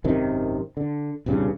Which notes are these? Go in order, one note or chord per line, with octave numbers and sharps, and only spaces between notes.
G#1 F#2 C3 D#3
D3
D#1 C2 G2 C#3